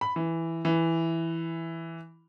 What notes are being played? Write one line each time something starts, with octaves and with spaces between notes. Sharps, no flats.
B5
E3
E3